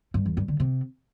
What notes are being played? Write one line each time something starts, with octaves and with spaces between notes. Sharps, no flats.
G2
E2
G2
D3
C3